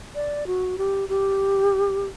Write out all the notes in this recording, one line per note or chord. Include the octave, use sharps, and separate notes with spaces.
D5
F#4
G4
G4